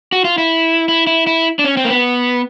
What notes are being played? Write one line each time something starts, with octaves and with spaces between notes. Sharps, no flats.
F#4
F4
E4
E4
E4
E4
D4
C#4
C4
A#3
B3